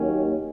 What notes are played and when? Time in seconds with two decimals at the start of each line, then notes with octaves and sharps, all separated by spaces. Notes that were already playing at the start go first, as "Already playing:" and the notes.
Already playing: D#2 D#3 F#3 A#3 C#4